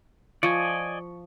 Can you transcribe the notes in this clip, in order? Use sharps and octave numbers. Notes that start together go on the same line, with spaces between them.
F3 D5 D#5 G#5 C#6 C#7